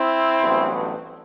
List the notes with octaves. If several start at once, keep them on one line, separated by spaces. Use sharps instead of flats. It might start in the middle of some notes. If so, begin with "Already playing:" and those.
Already playing: C4 E4
A1 G2 F#3 B3